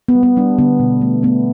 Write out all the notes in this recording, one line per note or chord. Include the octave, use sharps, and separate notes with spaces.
B3
G3
B3
G3 D4
D3 B3
B2
A3
A3 B3